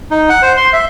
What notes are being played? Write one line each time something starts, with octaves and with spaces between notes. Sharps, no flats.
D#4
F#5
C5
C6
E5